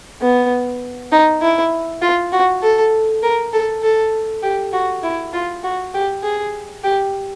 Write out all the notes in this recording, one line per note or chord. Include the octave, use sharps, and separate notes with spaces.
B3
D#4
E4
F4
F#4
A4
A#4
A4
A4
G4
F#4
E4
F4
F#4
G4
G#4
G4